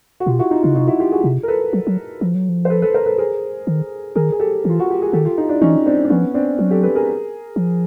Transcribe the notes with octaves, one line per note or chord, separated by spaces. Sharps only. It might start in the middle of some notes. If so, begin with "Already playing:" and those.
F#4
B2 F4 G4
E4 F#4
D#4 F4
C#3 D#4 F4
C3 D#4 F4
E4 F#4
F4 G4
F#4 G#4
C3
A#4
A4 B4
F#3
F#3
F3
F#3
F3
C5
A4 B4
A4 B4
A#4 C5
A4 B4
G#4 A#4
D#3
D#3 G#4 A#4
G#4
G4 A4
E3 F4
F#4
G4
G#4
D#3 G4 A4
F4 G4
D#4 F4
D4 E4
E3 C#4 D#4
C4 D4
D4
F3 B3 C#4
C4 D4
F#3
G4 A4
A4 B4
G#4 A#4
F3